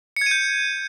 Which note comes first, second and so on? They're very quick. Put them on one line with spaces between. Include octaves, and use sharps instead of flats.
C#7 G#6 D#7 G6